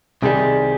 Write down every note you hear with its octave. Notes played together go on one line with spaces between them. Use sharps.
C2 C3 D#3 G3 G#4